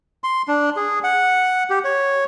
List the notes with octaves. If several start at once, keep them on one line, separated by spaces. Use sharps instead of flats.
C6
D4
G#4
F#5
G4
C#5